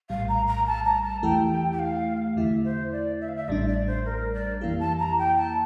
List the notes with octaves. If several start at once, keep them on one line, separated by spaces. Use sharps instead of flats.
A#1 A2 G3 F5
A#5
A#5
A5
A#5
A5
E2 E3 A3 E4 G4 G5
G5
F5
E2 D3 A3 E4 E5
C5
D5
E5
F5
E5
A1 A2 G3 D4 D5
D5
C5
A#4
D5
F2 E3 A#3 E4 G4 F5
A5
A#5
G5
A5